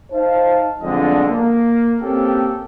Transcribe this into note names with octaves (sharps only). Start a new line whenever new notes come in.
D#4 C5 F5 A5
B1 F2 D3 G#3 D4 D#5
A#3
A#3 C4 C#4 G4 A4